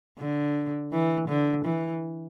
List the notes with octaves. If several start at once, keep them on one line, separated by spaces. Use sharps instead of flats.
D3
E3
D3
E3